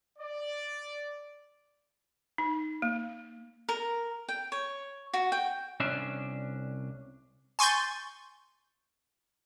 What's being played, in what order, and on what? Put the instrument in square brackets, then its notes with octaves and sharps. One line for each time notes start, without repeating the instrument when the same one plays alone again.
[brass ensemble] D5
[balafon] D#4
A#3
[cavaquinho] A#4
G5
C#5
F#4
G5
[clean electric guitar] C2 C#4 D4 E5
[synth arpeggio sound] G#5 C6 C#6 G6 A6